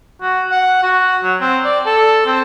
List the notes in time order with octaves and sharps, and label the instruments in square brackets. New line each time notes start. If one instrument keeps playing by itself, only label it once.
[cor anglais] F#4
F#5
F#4
F#3
C4
D5
A4
C4